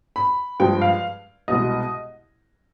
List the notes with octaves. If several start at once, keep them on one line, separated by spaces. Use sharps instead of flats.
B5
G2 F3 G#3 G5
F5
C2 B2 G#3 D#5